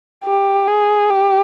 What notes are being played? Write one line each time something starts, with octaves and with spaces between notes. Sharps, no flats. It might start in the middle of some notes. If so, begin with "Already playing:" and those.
G4
G#4
G4